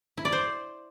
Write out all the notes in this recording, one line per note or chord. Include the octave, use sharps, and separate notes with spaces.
E4
D5
C5